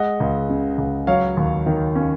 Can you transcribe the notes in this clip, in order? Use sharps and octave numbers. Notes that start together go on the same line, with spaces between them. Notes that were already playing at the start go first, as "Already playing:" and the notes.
Already playing: G#3 D#5 F#5
C#2
C#3
C#2
F#3 C#5 F5
D#2
D#3
C#4